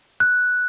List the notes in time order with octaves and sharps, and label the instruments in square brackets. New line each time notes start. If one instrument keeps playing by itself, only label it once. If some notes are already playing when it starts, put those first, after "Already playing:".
[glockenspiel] F#6